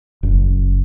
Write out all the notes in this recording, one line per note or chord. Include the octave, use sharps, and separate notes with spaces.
F#1